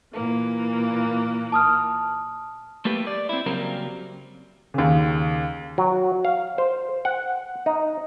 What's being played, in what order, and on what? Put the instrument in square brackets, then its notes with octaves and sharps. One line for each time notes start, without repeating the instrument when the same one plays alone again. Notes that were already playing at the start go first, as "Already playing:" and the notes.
[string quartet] A#2 E3 A#3
[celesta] A5 D#6 F6
[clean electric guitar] A3 A#3 G4 B4
D5
C4 E4
C#3 F#3 G3 A#3 C4 A#4
[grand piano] D#2 C#3
[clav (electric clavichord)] F#3
F5
C5
F#5
D#4